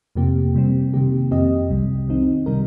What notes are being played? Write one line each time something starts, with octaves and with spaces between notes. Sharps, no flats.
F2 C3 F3 A#3 G4
C3 G3 C4
C3 D#3 A#3 G4
F2 F3 C4 G4 D#5
C2 C3 G3
D#3 C4 D#4
C3 G3 D#4 A#4